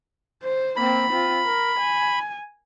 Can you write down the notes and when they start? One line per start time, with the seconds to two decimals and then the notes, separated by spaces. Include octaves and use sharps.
0.43 C5
0.76 A#3 C4 B5
1.10 C4 F4
1.45 A#4
1.79 G#5